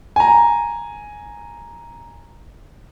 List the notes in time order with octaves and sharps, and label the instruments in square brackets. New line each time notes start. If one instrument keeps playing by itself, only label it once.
[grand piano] G#5 A#5